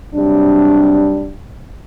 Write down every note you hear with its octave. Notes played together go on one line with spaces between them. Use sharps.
C3 F#3 G3 D4